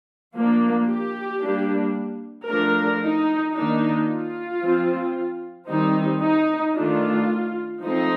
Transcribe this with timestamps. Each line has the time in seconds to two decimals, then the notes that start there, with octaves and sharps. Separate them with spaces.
0.34 F3 A#3 D4
0.88 G4
1.41 G3 A#3 D4
2.48 F3 A3 D4 A#4
3.02 D#4
3.55 D#3 A#3 D4 D#4
4.08 F4
4.62 F3 C4
5.69 D#3 G3 C4 D#4
6.22 D#4
6.76 D#3 A3 D4 F4
7.83 F3 A3 C4 D#4